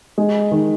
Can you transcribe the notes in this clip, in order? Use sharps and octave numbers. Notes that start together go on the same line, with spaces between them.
G#3
D#3